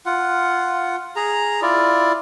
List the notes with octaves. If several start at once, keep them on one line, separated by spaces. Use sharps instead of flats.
F4 F#5
G#4 A#5
E4 F4 D5